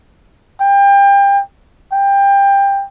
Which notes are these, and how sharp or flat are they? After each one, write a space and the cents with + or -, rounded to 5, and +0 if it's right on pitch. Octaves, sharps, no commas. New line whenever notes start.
G5 +30
G5 +20